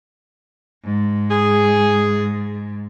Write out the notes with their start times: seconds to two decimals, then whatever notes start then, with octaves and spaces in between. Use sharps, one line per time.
0.84 G#2
1.31 G#4